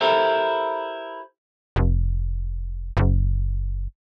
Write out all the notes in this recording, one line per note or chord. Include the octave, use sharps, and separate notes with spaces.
E4 G4 A4 A#4 C5 E5
F1
F#1